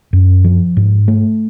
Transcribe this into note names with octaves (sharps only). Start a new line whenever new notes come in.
F#2
F3
G#2
A3